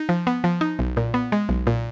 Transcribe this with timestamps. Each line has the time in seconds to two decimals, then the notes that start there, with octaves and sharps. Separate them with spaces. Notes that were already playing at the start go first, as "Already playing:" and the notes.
Already playing: D#4
0.09 F3
0.27 B3
0.44 F3
0.61 D#4
0.79 B1
0.97 A#2
1.14 B3
1.32 G#3
1.49 B1
1.67 A#2